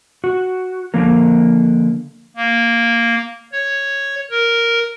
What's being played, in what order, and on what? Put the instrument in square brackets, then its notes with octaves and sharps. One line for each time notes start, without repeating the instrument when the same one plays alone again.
[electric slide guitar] F#4
D3 F3 A#3 A#4
[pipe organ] A#3
C#5
A#4